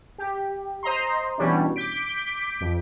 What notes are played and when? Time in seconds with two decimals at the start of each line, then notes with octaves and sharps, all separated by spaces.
0.18 G4
0.83 C5 D#5 A#5 C6
1.38 B2 E3 G3 C#4 D4
1.76 D6 G6 B6 D7
2.61 F2